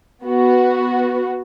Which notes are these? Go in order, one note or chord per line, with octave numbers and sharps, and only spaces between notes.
B3 F#4